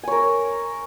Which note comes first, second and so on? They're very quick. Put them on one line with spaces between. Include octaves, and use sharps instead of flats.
G#5 C#5 A#4